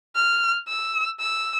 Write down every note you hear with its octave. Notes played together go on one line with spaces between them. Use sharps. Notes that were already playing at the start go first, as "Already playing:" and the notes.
F6
E6
E6